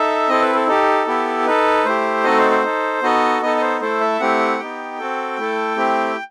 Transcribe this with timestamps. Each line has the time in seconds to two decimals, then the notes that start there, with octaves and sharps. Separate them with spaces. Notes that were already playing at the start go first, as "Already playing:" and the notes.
Already playing: D#4 A4 E5
0.28 C4 E4 A4 D#5
0.42 B4
0.55 A4
0.67 D#4 G4 A4
1.07 B3 E4 G4
1.46 D#4 A4 B4
1.85 A3 E4 G4 C5
2.24 A3 C4 D#4 F#4 A4 D#5
2.38 C5
2.51 C5
2.64 D#4 A4
3.02 B3 D#4 F#4 A4 D#5
3.41 B3 D#4 A4 D#5
3.56 D#5
3.61 C5
3.81 A3 E4 A4 C5
4.01 E5
4.20 A3 C4 E4 G4 F#5
4.59 B3 D#4 G4 G5
4.99 C4 F#4 A4
5.38 A3 E4 A4
5.76 A3 C4 E4 G4